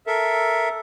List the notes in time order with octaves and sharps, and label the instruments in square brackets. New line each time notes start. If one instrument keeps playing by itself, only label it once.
[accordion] A4 A#4 E5